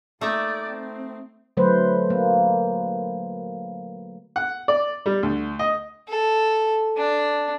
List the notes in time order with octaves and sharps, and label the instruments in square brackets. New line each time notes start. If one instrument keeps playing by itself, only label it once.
[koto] A3 D#4 E5 [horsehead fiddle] A#3 D5
[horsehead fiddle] C4
[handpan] D3 F#3 A3 B4 C5
A#3
[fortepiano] F#5
D5
G3
D2
D#5
[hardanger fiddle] A4
D4